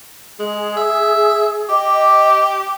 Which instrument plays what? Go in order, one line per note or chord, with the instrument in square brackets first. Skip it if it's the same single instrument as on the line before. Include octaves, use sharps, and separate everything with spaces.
[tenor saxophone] G#3 [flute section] G#4
[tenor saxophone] E5
[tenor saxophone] G4 [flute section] D#5 D6